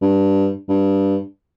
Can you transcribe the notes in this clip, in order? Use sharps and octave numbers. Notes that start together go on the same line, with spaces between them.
G2
G2